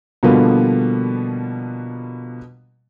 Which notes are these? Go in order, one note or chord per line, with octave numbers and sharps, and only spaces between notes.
B2 D3 F3 G3 A#3 B3